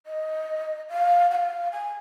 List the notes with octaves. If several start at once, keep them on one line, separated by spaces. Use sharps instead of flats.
D#5
F5
F#5
F5
G#5